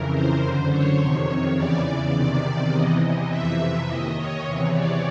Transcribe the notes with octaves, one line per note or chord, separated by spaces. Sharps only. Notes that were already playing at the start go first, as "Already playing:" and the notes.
Already playing: F2 C#3 E3 A#4
C5
F#2 D3
C#5
F2 C3 D#3 C#5
E2 C#3 E3 D5
E2 C3 D#3 D5
E2 C3 E3 D#5
F2 C3 E3 E5
D#2 D#3 D#5
C#5
E2 C3 E3
D5